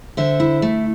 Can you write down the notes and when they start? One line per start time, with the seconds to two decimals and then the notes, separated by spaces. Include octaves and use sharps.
0.17 D3 C5 E5
0.40 E4
0.62 A3